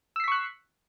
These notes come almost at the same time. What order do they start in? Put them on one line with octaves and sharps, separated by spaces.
E6 C7 B6 C#6 F#6